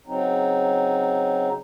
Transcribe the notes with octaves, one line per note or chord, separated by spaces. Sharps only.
C#3 F#3 C4 D#4